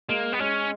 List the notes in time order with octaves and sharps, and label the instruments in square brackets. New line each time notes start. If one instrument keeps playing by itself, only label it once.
[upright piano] G#3 [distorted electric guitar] A#3
[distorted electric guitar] B3
[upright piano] G#3 [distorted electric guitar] C#4